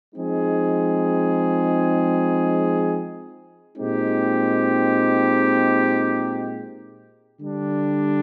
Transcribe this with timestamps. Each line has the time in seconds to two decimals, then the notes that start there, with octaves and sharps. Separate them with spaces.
0.15 F3 G#3 C4 D#4 G#4
3.77 A#2 G#3 C4 D#4 G4
7.39 D3 G3 D4